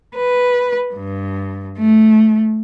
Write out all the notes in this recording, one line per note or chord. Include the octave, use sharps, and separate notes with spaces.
B4
G2
A3